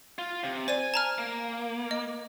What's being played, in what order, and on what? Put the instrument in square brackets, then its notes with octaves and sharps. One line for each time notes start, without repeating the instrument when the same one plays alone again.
[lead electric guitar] F4
C3
[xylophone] C5 D5 D#7 [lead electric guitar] G#5
[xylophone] A5 A#5 F6
[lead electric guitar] A#3
[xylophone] D#5